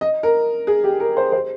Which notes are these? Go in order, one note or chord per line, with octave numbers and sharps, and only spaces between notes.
D#5
A#4
G#4
G4
A#4
C5
C5